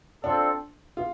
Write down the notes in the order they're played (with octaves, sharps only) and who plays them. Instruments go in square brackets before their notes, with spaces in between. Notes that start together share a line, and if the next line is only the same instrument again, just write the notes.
[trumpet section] C4 F4 A4 [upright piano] D4
[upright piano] F4